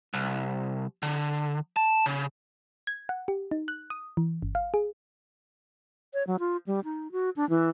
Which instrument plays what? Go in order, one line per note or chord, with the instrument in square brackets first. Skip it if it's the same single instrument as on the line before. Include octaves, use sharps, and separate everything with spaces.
[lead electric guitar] C2
D3
A5
C#3
[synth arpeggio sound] G#6
F#5
G4
D#4
F#6
D#6
E3
G1
F5
G#4
[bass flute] C#5
F#3
F4
G3
D#4
F#4
D4
E3